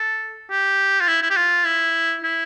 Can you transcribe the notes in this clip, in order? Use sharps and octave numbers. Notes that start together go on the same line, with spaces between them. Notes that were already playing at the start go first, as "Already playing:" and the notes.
Already playing: A4
G4
F4
E4
E4
G4
F4
E4
E4